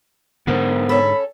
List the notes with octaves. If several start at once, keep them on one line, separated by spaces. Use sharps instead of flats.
G#2 D3 B3 A#4 C5
C#4 A4 B5